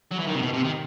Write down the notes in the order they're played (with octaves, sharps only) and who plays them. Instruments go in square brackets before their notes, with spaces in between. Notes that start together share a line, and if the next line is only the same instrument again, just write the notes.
[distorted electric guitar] F#3
E3
D#3
C3
B2
C3
D#3